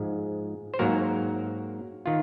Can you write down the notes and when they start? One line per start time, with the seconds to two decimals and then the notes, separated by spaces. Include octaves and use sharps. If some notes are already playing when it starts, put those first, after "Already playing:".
Already playing: G#2 F3 G#3 G#4
0.74 C5
0.79 G#2 F#3 A#3 F#4 A#4
2.06 D#3 F4